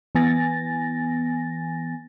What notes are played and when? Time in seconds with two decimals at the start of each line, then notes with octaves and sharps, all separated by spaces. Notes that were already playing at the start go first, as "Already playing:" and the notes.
0.15 E3 B3 G#5 A6 A#6